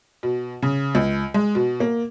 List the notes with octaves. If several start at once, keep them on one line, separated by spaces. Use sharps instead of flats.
B2
C#3
C#2
G#3
B2
A#3